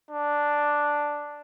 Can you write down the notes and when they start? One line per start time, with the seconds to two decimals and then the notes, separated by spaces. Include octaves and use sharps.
0.11 D4